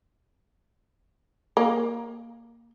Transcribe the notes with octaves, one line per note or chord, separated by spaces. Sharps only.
A#3